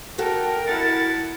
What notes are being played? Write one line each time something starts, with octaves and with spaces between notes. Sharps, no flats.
F#4 A4 A#4 G5
E4 F#5 A6